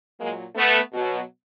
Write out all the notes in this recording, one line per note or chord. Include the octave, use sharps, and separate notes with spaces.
A#2 F#3 G#3 A#3
A3 B3
B2 F#3